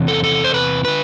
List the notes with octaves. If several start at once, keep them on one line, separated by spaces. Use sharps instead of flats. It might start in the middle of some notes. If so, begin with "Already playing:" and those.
Already playing: E2 C3 E3
A4
A4
C5
B4
D3 B4